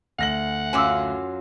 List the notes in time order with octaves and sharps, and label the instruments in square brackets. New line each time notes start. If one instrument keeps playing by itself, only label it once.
[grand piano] D2 A#6 F#7 [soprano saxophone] F#5
[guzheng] F#2 F#3 F4 [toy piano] G#5 D6 E6